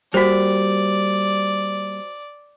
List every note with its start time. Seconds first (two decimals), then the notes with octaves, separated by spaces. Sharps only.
0.14 G3 A#3 F#4 C5 D5